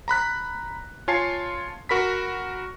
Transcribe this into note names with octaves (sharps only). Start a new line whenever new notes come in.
A#5 B5 F#6 B6
F4 C#5 G#5 A5 C7
F#4 A#4 B5 B6